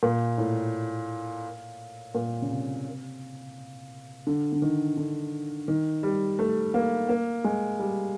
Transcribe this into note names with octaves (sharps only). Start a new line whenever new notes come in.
A#2
A2
A#2
C#3
C3
D3
D3
D#3
D3
D#3
G3
A3
A#3
A#3
G#3
G3